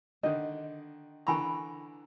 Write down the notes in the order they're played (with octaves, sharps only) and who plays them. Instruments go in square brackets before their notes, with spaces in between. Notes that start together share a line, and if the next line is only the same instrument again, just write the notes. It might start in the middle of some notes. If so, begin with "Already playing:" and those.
[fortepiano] D3 D#3 [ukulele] D#5
[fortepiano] D3 E3 A#5 [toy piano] G#5 B5 C#6